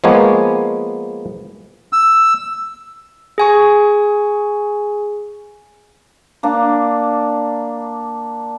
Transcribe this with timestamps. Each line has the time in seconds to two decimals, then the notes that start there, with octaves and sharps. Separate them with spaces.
0.04 F3 G#3 A#3 B3 C#5
1.93 E6
3.38 G#4 G#5 C#6
6.43 A#3 D4